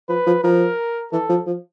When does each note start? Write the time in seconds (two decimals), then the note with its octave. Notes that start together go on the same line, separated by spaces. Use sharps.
0.09 F3 B4
0.27 F3
0.43 F3 A#4
1.12 E3 A4
1.29 F3
1.47 F3